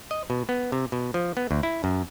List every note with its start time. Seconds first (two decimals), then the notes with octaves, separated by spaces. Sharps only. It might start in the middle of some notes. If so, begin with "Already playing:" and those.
0.11 D#5
0.30 B2
0.49 B3
0.72 C3
0.92 B2
1.14 F3
1.37 B3
1.51 D2
1.63 E4
1.84 F#2